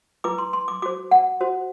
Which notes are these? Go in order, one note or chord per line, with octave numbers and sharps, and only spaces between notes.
E4 B4 D6
C6
C6
D6
F#4 C5 D6
F#5
F#4 C5